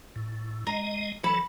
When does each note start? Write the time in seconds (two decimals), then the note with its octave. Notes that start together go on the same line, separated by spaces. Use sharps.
0.16 A2
0.67 G#3 D#5 A#5
1.24 E3 F#3 A4 B5